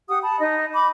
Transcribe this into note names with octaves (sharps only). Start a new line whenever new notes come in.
G4 F#5 D#6
A5 B5
D#4 D#5
B5 D6